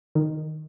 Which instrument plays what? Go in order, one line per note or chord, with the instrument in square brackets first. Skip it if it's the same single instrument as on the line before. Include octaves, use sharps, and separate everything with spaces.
[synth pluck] D#3